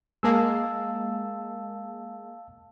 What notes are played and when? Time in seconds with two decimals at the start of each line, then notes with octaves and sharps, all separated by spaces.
0.23 G#3 A#3 F5 A5 E6